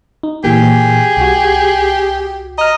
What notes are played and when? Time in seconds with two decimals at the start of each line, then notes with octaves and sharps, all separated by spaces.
0.23 D#4
0.44 A#2 E3 A#3 G4 G#4
1.17 C2 F#4
2.58 D#5 A#5 F6